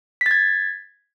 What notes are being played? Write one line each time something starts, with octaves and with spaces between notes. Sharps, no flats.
G#6 A6 B6